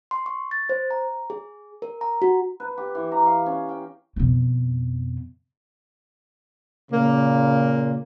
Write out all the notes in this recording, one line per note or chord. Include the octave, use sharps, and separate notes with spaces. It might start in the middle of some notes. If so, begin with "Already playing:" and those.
C6
C#6
A6
C5
A#5
G#4
A#4
A#5
F#4
B4
G4
E3
A#5
F5
C#4
G5
F2 B2
A#2 C#3 A#3